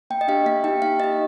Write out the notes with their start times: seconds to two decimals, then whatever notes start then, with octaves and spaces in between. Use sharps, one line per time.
0.10 A#3 G5
0.21 D#5
0.28 D4 G4 F5
0.46 A#3 F5
0.64 D#4 G4 G5
0.82 A#3 F5
0.99 D#4 G4 D#5